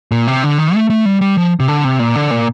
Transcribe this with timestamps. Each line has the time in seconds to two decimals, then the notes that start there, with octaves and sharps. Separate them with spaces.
0.12 A#2
0.27 C3
0.44 D3
0.58 D#3
0.75 A3
0.90 A3
1.05 G3
1.21 G3
1.37 F3
1.60 C3
1.68 D3
1.84 C3
1.99 A#2
2.15 D3
2.31 A#2